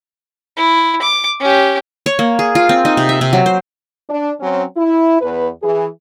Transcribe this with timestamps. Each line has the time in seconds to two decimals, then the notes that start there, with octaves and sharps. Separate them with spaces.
0.57 E4
1.02 D6
1.40 C#4 G4
2.06 C#5
2.19 A#3
2.39 G#4
2.55 F4
2.69 C4
2.85 D#4
2.97 C3
3.09 E5
3.21 C3
3.33 F#3
3.46 C5
4.10 D4
4.40 F#3 C4 C#4
4.77 E4
5.21 E2 B4
5.62 E3 G#4